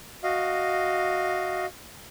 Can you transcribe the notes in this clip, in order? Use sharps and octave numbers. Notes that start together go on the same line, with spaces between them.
F#4 D#5 F5